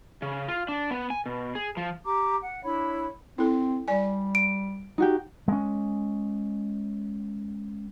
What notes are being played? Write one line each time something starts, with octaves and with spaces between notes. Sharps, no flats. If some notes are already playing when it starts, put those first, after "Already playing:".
C#3
F4
D4
B3
G#5
B2
G#4
F3
G4 A#5 D6
F#5
D4 E4 C#5 B5
C4 E4 A4
G3 D5 G#5
D7
D#4 F#4 G4
G#3 C#4